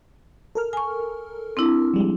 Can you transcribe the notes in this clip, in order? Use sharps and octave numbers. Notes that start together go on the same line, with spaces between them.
A4 A#4 F6
G#5 C#6
C4 D4 E4
F3 G3 G#3